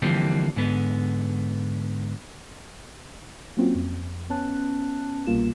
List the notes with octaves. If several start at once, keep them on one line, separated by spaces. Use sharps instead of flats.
D3 E3 F3 G3 A#3 C4
G#2 D3 B3
F#3 A#3 C4 C#4 F4 F#4
F2
B3 C#4 A5 F#6
C2 B2 G3 A#3 F4 E7